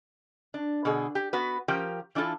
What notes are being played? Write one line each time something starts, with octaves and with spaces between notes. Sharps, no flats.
D4
B2 D3 G#4
G4
B3 F#4 B4
F3 C#4 G4 A#4 G5
E3 D4 E4 F4 A4